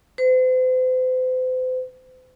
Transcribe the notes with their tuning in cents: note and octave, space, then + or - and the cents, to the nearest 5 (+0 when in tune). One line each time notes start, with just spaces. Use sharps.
C5 -40